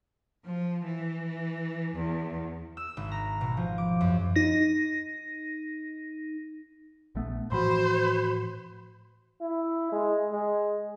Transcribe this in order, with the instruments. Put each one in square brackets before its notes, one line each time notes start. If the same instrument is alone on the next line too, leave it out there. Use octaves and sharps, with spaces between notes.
[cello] F3
E3
E2
[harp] E6
G#1
A#5
B2
F3
D6
F#2
[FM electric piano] D#4 A#6
[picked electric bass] A#1 A3 B3
[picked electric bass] A2 E3 F3 [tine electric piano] F#4 B5 C6 [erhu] C5
[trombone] E4
G#3
G#3